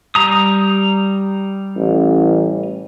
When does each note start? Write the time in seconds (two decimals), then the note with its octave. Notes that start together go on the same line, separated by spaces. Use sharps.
0.15 G3 A#5 D#6
1.76 A1